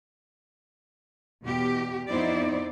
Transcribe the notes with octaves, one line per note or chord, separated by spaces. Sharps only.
E2 B2 G4
F2 B3 D#4 E4 C5 D5